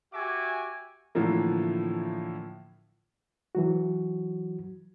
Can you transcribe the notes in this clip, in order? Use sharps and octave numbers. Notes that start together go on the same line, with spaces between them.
F#4 G4 E5 G#5 D6
A2 D3 E3 F3 A#3
E3 F#3 F#4